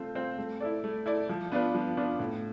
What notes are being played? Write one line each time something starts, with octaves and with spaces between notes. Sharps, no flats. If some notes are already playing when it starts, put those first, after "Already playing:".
Already playing: A3 C4 F4 C5
C4 F4 C5
A3
E4 A4 D5
A3
E4 A4 D5
F3
B3 D4 F4 B4
F3
B3 D4 F4 B4
A2